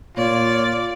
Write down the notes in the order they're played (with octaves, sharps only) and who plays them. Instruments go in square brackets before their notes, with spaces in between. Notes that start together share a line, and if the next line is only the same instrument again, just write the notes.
[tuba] A#2 [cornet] F4 [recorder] C#5 [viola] D5